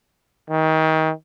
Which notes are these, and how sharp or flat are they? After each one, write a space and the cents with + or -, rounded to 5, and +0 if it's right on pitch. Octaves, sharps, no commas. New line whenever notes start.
D#3 +30